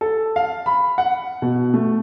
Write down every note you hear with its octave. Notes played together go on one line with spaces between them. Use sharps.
A4
F5
B5
F#5
B2
A3